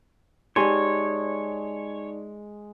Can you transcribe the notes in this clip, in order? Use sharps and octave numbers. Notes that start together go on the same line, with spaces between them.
G#3 D#4 G4 C#5 D5 G#5 C6